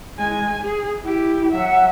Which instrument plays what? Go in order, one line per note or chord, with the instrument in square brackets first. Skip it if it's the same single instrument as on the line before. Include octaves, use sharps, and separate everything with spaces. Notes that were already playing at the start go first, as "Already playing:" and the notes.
[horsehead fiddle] G#3 G#5
G#4
E4 G4
[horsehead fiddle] F#3 E5 [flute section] F#5